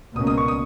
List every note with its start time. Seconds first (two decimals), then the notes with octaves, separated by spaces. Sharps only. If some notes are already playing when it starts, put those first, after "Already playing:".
0.16 C#2 B2 A#3 C#4 D#6
0.27 D#6
0.37 C#6
0.48 D#6